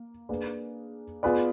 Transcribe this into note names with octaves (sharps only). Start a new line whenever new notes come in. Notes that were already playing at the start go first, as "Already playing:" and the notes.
Already playing: A#3
A#3 D4 G#4 B4
B3 F4 G#4 B4 D5